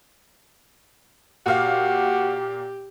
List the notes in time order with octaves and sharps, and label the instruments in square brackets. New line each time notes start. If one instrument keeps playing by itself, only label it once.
[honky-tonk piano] A#2 F5 [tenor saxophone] F#4 [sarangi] G4